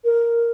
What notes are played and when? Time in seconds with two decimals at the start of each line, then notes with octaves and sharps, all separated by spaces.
0.04 A#4